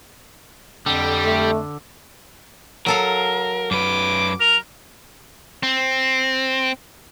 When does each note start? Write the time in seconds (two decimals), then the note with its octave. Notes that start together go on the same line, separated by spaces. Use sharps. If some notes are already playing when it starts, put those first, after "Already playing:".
0.86 F2 D3 G3
1.24 A3
2.86 F#3 A4 A#4 F5
3.71 F#2 B4 D6
4.41 A#4 F7
5.63 C4